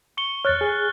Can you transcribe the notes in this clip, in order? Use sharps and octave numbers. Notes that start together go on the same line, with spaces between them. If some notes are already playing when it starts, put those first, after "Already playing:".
C#6 C#7 G7
E2 C#5 F6 F#6 A6
G#4